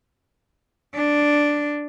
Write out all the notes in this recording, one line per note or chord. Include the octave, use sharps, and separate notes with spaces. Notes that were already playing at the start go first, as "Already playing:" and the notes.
D4